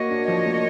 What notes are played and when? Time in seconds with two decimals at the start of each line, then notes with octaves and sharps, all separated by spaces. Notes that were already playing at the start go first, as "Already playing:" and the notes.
Already playing: A#3 F#4 C#5 D#5
0.10 D4
0.28 F3
0.46 A#3